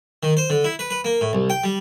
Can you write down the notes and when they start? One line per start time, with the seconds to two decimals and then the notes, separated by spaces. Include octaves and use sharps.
0.23 D#3
0.37 C5
0.50 D3
0.64 E4
0.79 B4
0.91 B4
1.04 A#3
1.21 A2
1.33 C2
1.50 G5
1.64 G3